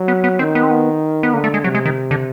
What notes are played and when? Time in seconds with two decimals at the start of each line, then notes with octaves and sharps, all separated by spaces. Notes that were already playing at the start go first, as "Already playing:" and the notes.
Already playing: F#3
0.08 B3
0.24 B3
0.39 D#3 C4
0.55 B3
0.63 C4
0.71 B3
1.23 B3
1.33 D3 A#3
1.44 A3
1.54 G#3
1.64 C3 F#3
1.75 G#3
1.85 D#3
2.11 D3